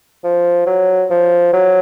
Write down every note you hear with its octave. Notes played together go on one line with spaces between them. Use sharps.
F3
F#3
F3
F#3